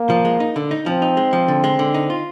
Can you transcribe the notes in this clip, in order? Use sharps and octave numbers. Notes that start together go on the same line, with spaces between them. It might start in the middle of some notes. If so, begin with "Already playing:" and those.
Already playing: A#3
F3
G#3
D#4
D3
D#4
F3 C4
D#4
G#3
F3
D3
G#3
D3
D#4
F4